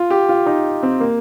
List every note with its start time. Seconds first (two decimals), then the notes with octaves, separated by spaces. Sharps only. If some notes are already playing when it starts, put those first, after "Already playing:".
Already playing: F4
0.10 G4
0.29 F4
0.46 D#4
0.83 C4
1.00 A#3